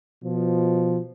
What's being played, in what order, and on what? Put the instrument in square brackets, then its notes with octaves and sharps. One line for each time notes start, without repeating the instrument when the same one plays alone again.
[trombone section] B2 F3